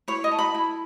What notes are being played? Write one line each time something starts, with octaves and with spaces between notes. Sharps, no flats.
E4 C#5
D#5
A4
B5
E4